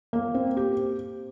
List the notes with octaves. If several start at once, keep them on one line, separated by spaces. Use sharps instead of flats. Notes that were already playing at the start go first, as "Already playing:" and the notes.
A#3
C4
G4